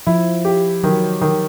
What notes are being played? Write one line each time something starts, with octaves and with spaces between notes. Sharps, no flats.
F3 E4
G4
D#3 F#3
D#3